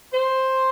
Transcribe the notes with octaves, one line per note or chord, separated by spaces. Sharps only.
C5